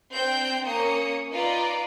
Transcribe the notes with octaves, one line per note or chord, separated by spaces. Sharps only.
C4 D4 C5 G5 G6
A#3 C#4 D#6 C#7
D#4 F4 B4 D5